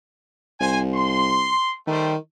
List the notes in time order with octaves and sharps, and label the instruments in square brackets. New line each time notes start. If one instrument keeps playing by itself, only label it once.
[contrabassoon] C2 [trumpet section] C5 G#5
[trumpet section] C6
[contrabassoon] D#3 [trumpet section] G3 A3 C5